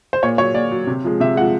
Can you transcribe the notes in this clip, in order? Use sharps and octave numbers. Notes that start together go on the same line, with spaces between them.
C5
A#2 C#5
F#3 C#5
A#2 D5
F#3
C3
F3 G#3
C3 E5
F3 G#3 F#5